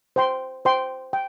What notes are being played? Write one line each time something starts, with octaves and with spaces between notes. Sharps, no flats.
C5 G5 C6
C5 G5 C6
G5